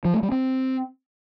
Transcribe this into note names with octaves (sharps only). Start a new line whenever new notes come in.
F3
A3
G3
C4